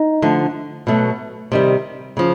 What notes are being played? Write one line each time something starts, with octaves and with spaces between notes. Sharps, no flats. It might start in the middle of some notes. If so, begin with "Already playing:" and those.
Already playing: D#4
D3 F3 A3
B2 F#3 A3
C3 D#3 G3
C#3 F3